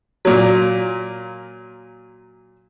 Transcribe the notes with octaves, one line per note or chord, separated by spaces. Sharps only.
A#2 F#3